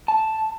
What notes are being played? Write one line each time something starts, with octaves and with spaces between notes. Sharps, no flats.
A5